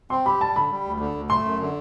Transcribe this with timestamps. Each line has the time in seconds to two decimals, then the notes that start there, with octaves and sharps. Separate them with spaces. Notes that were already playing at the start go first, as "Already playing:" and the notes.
0.10 C4 C6
0.26 G4 B5
0.41 G3 A5
0.56 D3 B5
0.71 G3
0.85 D2
1.00 D3
1.15 D2
1.30 A3 C6
1.45 F#2
1.60 D3